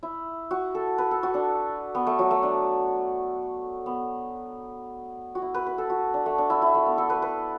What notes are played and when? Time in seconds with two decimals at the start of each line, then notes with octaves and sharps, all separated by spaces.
0.03 E4
0.51 F#4
0.75 A4
0.98 B4
1.11 A4
1.23 F#4
1.34 D4
1.95 B3
2.07 A3
2.19 F#3
2.31 A3
2.43 D4
3.86 B3
5.35 F#4
5.42 E4
5.54 B4
5.67 B4
5.78 A4
5.90 F#4
6.14 D4
6.26 A3
6.38 D4
6.50 E4
6.62 E4
6.75 A3
6.86 B3
6.98 A4
7.10 B4
7.22 B4